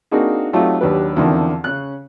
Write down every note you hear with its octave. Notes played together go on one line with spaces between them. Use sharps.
A#3 C4 D4 D#4 F#4 G#4
F#3 A3 C4 D#4 F4 G4
D#2 F#3 D4 G4 B4
E2 D3 D#3 F3 C4
C#3 C#4 F#6